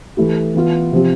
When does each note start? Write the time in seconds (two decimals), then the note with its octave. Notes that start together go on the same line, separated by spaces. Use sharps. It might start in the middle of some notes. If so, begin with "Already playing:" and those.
0.17 E3 A3 E4 G4
0.55 E3 B3 F4
0.92 C3 F3 C4 G4